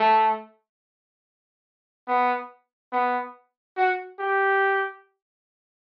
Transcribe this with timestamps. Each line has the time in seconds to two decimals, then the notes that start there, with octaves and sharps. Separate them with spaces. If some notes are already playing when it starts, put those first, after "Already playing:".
Already playing: A3
2.08 B3
2.93 B3
3.77 F#4
4.20 G4